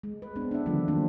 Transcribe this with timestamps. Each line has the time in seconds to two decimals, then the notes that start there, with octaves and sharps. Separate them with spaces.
0.03 G#3
0.22 B4
0.36 B3 C4 D4
0.51 D4 E5
0.66 D3 D#3 F3 G3 A3
0.88 D#3 F#3 A#3 C4 D4